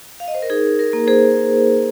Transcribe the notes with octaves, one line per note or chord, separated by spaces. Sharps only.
F5
D#5
C5
A#4
D#4 G#4
A#4
A#3
G#4 C5